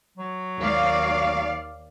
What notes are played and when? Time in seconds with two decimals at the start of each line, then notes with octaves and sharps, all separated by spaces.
0.17 F#3
0.58 D#2 D5 F5